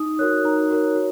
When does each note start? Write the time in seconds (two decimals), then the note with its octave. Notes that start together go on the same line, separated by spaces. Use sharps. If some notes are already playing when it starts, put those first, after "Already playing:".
Already playing: D#4 D#6
0.19 F#4 A#4 C#5 F#6
0.44 D#4 A#5
0.70 F#4 A#4 C#5
0.96 F#4